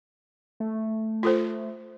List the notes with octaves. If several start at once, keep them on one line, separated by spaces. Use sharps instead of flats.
A3
F4 A4 C5